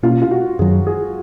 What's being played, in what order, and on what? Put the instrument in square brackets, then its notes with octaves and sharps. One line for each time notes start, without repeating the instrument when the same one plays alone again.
[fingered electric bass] B2 A#3 C#4 [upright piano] F4
[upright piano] F4
F#4
[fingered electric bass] F#2 D#3 F#3 [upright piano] G#4
[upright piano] G#4